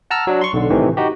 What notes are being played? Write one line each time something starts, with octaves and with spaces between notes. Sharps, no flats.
F#5 A5 A#5 E6 F6
F#3 D4
C6 C#6
B1 D3
A2 C3 D#3 E3 A3
D#4 F#4 G4